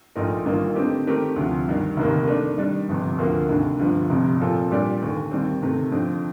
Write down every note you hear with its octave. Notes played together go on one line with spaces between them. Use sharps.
A#1 A#2 A3 D#4 A#4
A1 G2 D#3 A#3 F4
D3 A3 C4 D#4 G4
D#3 A3 C4 G4 A#4
D2 C3 F3
G2 D#3 G3
F1 D#2 D#3 A#3
D#3 A3 D4
D#3 G3 D4
G1 F2 C3
D2 D3 F3 A#3
F1 D#2 D3
G1 G2 D3 F3
F1 F2 C3
A#2 F3 C4 F4 A4
A#2 G3 D4 G4 D5
D#2 D3 A3
D#2 D#3 G3 C4
C3 D#3 A3
F2 D3 F3 C4